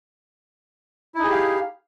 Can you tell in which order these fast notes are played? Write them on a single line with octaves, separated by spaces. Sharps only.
E4 D#4 G#4 G4 F5